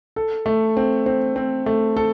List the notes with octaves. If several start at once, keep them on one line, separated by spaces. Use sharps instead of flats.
A4
A3
C4
C4
C4
A3
A4